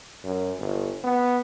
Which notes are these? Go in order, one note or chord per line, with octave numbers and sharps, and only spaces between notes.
F#2
G1
B3